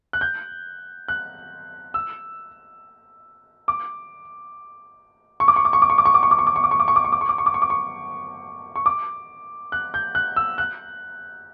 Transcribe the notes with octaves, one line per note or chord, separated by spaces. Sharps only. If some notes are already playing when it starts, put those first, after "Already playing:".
F#6
G6
F#6
E6
D6
C#6
D6
C#6
D6
C#6
D6
C#6
D6
C#6
D6
C#6
D6
C#6
D6
C#6
D6
C#6
D6
C#6
D6
C#6
D6
C#6
D6
C#6
D6
C#6
D6
C#6
C#6
D6
F#6
G6
F#6
E6
F#6